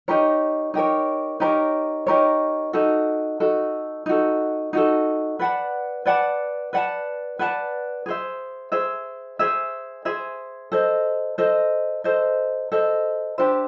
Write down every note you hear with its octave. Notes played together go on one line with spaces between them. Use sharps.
D#4 G4 A#4 C#5
D#4 G4 A#4 C#5
D#4 G4 A#4 C#5
D#4 G4 A#4 C#5
D#4 F#4 A4
D#4 F#4 A4
D#4 F#4 A4
D#4 F#4 A4
B4 D5 F#5 A5
B4 D5 F#5 A5
B4 D5 F#5 A5
B4 D5 F#5 A5
G#4 C5 E5
G#4 C5 E5
G#4 C5 E5
G#4 C5 E5
A4 C5 D#5
A4 C5 D#5
A4 C5 D#5
A4 C5 D#5
D4 G4 C5 E5